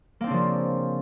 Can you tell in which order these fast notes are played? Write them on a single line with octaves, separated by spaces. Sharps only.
A#3 C4 D4 C#3 F3